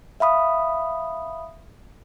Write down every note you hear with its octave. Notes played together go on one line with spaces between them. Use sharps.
E5 F5 B5 D#6